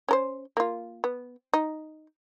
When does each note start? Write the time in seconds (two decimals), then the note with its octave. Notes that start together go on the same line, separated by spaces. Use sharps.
0.09 C#4 A#4 C5
0.57 A#3 F4
1.04 B3
1.54 D#4